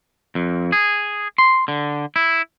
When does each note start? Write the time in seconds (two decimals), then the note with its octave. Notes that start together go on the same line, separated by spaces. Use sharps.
0.35 F2
0.72 G#4
1.38 C6
1.68 D3
2.16 E4